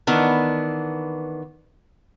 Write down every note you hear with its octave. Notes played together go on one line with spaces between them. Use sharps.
D#3 E3 B3 D4